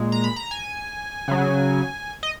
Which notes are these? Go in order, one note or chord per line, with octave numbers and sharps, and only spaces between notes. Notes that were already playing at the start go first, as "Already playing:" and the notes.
Already playing: A#2 G#3
A#5
B5
A#5
G#5
C#3 F#3
D#5